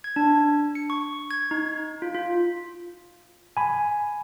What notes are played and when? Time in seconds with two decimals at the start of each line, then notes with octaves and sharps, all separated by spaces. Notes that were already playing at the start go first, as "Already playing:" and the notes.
0.04 G#6
0.16 D4
0.75 C#7
0.90 C#6
1.31 G#6
1.51 D#4
2.02 F4
2.15 F4
3.57 G#5 B5